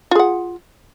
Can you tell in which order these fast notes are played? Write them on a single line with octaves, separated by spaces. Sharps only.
F4 G#4 F#5